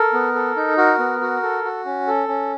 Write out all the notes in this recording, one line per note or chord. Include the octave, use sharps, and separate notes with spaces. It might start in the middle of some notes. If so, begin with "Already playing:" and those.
Already playing: A4 A#4
B3
A4
D#4
F#4 A#4
B3
F#4
A4
F#4
C#4
A4
C#4